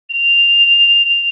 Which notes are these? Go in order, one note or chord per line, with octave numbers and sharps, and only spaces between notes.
F7